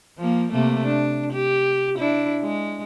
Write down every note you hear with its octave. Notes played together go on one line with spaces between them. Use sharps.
F3 A#3
C3 A3 A#3
D4
G4
D4 E4
G#3